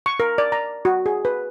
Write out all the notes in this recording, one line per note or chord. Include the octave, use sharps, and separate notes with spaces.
C#6
A#4
D5
A#5
F#4
G#4
B4